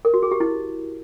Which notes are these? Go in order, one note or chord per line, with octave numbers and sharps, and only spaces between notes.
A#4
F#4
G#4
G4
E4